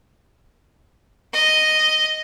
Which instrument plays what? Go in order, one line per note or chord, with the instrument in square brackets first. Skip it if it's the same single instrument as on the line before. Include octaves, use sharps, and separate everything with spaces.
[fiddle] D#5